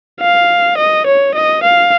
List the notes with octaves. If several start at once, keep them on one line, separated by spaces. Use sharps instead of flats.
F5
D#5
C#5
D#5
F5